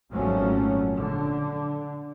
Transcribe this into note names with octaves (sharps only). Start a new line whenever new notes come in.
G#1 A#2 F3 F#3 A3 C#4
D3